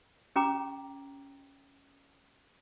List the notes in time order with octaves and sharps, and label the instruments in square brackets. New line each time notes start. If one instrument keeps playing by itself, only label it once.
[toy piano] C#4 G4 G5 A#5 D6